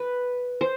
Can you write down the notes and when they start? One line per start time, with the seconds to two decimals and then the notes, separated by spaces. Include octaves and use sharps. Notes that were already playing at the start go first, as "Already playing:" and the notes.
Already playing: B4
0.61 C5